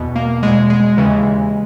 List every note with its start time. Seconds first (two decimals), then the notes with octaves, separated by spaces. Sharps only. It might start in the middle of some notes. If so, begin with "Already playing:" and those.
Already playing: E2 B2
0.16 A#3
0.43 E2 B2 G#3
0.70 G#3
0.97 D#2 C#3 E3